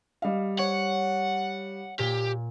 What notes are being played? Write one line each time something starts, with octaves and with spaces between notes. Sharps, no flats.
G3 D#5 F5
C#5 F#5 C#7
A#2 G4